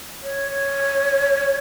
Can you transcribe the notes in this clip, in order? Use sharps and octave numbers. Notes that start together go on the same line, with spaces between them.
C#5